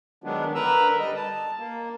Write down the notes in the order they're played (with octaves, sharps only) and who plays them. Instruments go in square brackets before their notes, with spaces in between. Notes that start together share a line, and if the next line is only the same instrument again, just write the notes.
[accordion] D#3 F#3 G#3 B3 D4
D3 A#4 B4 A#5 E6
G3 D#5
A5
A#3